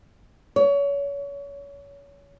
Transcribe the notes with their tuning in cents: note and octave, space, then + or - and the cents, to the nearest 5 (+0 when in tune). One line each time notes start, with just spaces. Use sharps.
C#5 +30